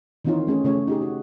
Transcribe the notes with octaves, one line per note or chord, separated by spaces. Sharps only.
D#3 E3 C4 D#4 F4 C#5
A3 C#4 G#4
C#3 A3 C#4 C#5
D#4 G4 G#4
F#4